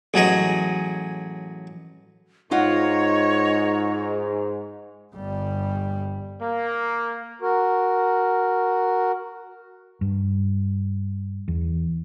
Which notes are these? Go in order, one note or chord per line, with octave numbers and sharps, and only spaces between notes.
A1 F#3 G#4 D#5
G#2 D#4 F4 C#5 D#5 F#5
G1 G3
A#3
F#4 A#4
G2
E2